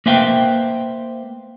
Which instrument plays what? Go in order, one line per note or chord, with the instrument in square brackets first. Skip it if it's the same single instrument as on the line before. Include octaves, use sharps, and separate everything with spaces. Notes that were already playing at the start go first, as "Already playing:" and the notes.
[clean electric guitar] A#3 B4 C5 E5 F5 G5